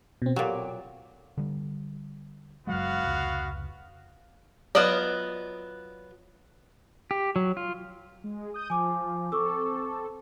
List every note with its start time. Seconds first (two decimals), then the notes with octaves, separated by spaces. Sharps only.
0.22 B2 C4
0.36 A#2 F#3 G4 D6
1.37 D3 G3
2.67 F#1 F#3 G#3 B3 F#4 F5
3.03 F1 C#2
4.75 F#3 B3 F4 D5 D#5
7.11 G4
7.36 F#3
7.57 F4
8.24 G#3
8.54 D#6 G6 D#7
8.70 F3 G#5 D6
9.32 C4 A4 C#6 D6 E6